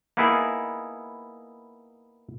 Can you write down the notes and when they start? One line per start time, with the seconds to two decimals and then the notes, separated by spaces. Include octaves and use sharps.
0.17 A#3 B3 D#4 E4 G#4